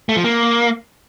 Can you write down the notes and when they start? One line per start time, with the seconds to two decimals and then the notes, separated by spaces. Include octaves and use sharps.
0.09 A3
0.17 F3
0.24 A#3